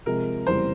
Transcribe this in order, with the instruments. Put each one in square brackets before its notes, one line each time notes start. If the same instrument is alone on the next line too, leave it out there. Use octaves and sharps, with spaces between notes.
[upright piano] C3 F3 G#3 [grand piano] A#4
[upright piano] F1 E2 C#3 G3 C4 [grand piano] C5